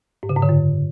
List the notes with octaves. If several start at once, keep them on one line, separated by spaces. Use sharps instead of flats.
G#2
C#3
G#2
D3
F#2